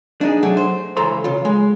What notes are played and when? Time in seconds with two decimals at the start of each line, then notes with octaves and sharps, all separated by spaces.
0.21 D4 D#4 G#4
0.43 F#3 A3 D4 G#4
0.57 C5
0.97 C#2 E3 A4 A#5 C6
1.24 C#3 F4
1.45 G#3